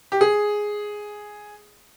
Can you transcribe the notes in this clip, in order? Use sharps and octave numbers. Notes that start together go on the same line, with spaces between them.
G4
G#4